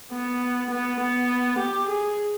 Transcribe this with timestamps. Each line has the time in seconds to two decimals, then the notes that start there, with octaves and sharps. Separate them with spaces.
0.12 B3
0.71 B3
1.01 B3
1.60 G4
1.89 G#4